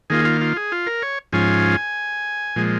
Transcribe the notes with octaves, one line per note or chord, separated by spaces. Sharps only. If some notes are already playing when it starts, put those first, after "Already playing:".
D#3 A#3 F4 G#4
F4
F4
G#4
F4
A#4
C#5
G#2 F3 C#4 F4 G#5
A#2 F3 G#3